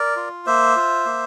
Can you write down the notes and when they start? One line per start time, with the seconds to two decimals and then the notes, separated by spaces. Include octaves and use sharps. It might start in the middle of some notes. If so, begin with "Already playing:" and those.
Already playing: A#4 D5
0.16 F4
0.46 A#3 C5 E5
0.76 F4
1.06 A#3